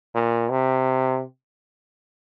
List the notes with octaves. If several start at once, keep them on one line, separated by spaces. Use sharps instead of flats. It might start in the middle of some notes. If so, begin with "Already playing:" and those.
A#2
C3